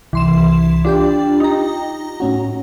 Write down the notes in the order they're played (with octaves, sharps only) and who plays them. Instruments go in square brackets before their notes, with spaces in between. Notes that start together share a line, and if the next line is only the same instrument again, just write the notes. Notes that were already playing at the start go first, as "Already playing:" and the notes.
[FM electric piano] C2 [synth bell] E3 C6 E7
[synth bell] D4 [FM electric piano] F4 G4 G5
[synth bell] D#4 A#5
[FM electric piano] A2 C#4 F#4